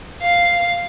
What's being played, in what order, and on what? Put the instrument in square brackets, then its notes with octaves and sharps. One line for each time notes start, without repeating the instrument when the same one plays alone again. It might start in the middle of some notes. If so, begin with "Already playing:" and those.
[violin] F5